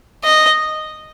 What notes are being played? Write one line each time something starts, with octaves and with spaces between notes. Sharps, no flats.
D#5